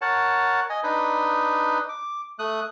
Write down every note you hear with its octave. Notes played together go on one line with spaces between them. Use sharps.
A#4 C#5 F#5 A5
D#5 G#5
D4 D#4 B4
D6
A3 D#6 F#6